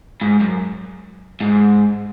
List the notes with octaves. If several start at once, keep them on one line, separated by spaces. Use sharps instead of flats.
G#2
F#2
G#2